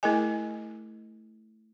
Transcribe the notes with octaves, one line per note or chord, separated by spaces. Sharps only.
A3 E4 G#4 A#4 D#5 G#5